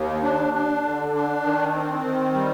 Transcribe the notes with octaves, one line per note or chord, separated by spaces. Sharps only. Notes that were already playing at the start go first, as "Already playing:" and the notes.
Already playing: D#2
D4
D4
D3
D4
D#3
C4
D#3
G3